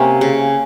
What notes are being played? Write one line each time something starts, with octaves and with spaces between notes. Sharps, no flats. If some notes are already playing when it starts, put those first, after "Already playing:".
Already playing: C3 A#3 C#4
C#3